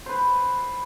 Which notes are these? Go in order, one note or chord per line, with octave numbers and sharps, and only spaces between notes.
B4 C5